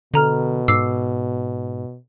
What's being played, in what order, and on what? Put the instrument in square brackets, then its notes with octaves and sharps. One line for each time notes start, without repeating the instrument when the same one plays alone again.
[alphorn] B2 [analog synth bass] D3 [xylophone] A4 A#5 F6
[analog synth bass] G#2 [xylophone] D6 E6 C7